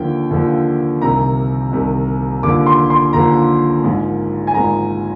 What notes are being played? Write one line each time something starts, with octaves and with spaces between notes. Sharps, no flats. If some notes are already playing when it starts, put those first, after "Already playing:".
Already playing: D#2 D3 F3 G5
D#2 D3 F3
C2 C3 D#3 A#5
C2 C3 D#3
D#2 D3 F3 D6
C6
C6
D#2 D3 F3 A#5
G#1 G#2 F3
G#5
G#1 G#2 F3 A#5